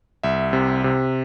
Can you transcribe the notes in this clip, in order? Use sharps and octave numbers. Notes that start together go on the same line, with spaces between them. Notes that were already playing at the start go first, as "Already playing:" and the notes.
C2 E5
C3
C3